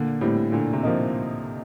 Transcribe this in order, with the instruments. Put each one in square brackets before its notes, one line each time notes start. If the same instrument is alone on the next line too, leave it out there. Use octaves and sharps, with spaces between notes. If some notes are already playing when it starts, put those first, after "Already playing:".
Already playing: [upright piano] A#2 [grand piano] D3
[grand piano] A2 [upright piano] G3 C4
[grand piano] A#2 [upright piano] D3
[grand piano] C3
[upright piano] F3 A#3 D#4